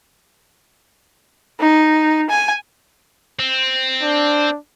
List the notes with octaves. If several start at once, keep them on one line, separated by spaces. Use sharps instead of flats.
D#4
G#5
C4
D4